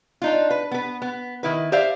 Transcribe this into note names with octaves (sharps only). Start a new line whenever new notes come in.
D4 D#4 F4
B4
B3 B4
B3
D#3 E4 B4
G4 C5 D5 E5 F5